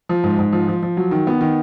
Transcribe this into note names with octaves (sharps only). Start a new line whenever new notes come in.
F3
G#2
G#2
F3
F3
F3
F#3
D#3
B3
D#3